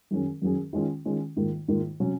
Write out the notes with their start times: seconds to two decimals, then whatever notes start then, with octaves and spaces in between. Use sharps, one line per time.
0.11 F#2 D#3 F#3 C#4 G#4
0.42 F#2 D#3 F#3 C#4 G#4
0.73 D#3 G#3 C#4 F4
1.05 D#3 G#3 C#4 F4
1.36 G#2 D#3 A#3 F4
1.68 G#2 D#3 A#3 F4
2.00 C3 F#3 C#4